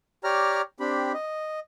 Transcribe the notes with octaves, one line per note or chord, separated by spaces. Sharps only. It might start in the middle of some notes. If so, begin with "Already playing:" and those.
G4 C#5 D5 A#5 F6
C4 D4 G4 B5
D#5